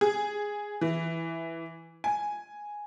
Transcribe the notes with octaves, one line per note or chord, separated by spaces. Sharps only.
G#4
E3
G#5